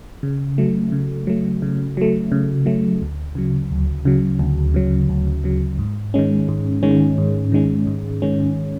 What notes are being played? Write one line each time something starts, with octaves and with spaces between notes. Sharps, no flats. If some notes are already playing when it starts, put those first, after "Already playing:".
C#3
F#3 A3
C#3
F#3 A3
C#3
F#3 A3
C#3
F#3 A3
D2
C#3 F#3
D2
C#3 F#3
D2
C#3 F#3
D2
C#3 F#3
G#2
D#3 G#3 C#4
G#2
D#3 G#3 C#4
G#2
D#3 G#3 C#4
G#2
D#3 G#3 C#4